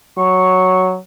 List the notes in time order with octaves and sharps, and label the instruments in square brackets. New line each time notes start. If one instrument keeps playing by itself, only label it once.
[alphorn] F#3 [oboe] C#6